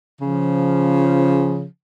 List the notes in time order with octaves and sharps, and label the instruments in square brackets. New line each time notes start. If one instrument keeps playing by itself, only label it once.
[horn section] C#3 F3